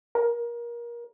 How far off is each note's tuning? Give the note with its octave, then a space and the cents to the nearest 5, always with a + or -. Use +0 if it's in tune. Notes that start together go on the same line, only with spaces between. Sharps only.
A#4 +25